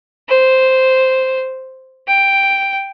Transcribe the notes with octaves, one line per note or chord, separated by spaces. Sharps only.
C5
G5